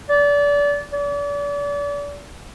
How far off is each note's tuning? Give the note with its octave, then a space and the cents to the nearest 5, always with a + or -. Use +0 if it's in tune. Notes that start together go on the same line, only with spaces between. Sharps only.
D5 -30
D5 -35